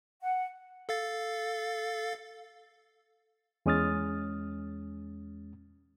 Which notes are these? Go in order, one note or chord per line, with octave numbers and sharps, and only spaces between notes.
F#5
A4 F5 A6
E2 G#3 C#4 D#6 F6 A6